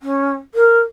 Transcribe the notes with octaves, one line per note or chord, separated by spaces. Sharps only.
C#4
A#4